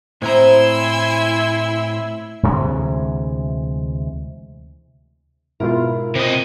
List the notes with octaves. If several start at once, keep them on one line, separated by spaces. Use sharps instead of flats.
A2 C4 E4 G#5 A#5 C6 E6
D2 C3 E3 G#3
G#2 B2 E4 F4 A#4
C3 C4 D#5